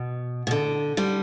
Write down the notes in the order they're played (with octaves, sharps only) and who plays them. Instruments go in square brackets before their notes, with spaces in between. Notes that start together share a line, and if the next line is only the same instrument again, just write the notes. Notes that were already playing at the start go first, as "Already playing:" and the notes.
Already playing: [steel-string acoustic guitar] B2
B2
D3
D3 G3